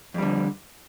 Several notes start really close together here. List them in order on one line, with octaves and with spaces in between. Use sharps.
F2 G3 D3